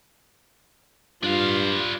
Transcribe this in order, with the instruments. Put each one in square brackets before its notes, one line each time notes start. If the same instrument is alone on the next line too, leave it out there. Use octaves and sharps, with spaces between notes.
[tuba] G2 [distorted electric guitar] D4 F5 [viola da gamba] F4